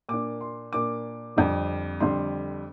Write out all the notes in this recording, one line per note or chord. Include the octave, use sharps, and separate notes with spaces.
A#2 A#3 D4 D6
C6
A#2 A#3 D4 D6
F2 D3 G3
F2 D3 G3 C6